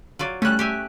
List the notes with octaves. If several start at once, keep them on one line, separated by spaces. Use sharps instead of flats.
F#3 F4 D5
G3 A3 C#4 F#6
G4 E5 G#5